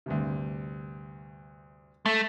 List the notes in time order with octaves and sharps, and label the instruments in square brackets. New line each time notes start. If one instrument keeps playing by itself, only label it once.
[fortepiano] D2 G2 C3
[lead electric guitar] A3